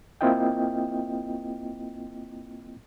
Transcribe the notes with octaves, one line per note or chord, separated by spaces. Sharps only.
A#3 C4 E4 F4 D#5 G5